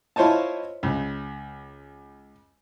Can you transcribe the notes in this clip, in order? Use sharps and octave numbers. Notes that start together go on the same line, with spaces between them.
E4 F4 C5 C#5 D#5 A5
C#2